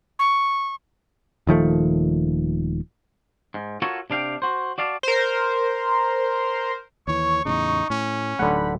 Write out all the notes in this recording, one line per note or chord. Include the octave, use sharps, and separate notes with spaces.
C#6
D#1 D#3 F3 A3
G#2
F4 F#4 A4 A#4 C#5
C3 D4 F5 G5
F#4 C5
F#4 D5 F5 A5
A#4 C5
D#2 E3 C#5 C#6
E2 A2 C#3 D#4
A2 C#4
D1 G2 D3 F#3 A3 D#4 F#5 B5